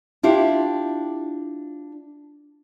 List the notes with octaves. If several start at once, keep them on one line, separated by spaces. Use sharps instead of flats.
D4 E4 F4 G4